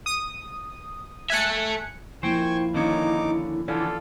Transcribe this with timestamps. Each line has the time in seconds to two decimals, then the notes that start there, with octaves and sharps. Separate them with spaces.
0.06 D#6
1.30 A4 E5 G#5 F#6 C#7
2.23 F3 A#3 E4 C5 G5 G#5 C#6
2.74 D3 D#3 A#3 C#4 D#4 C#5 D6
3.68 D3 E3 C#4 F4 A4 D5